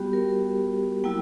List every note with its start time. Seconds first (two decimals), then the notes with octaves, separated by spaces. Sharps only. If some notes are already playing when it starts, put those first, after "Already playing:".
Already playing: G3 B3 F#4 G4
0.13 A#4
1.04 F#3 A#3 E4 G5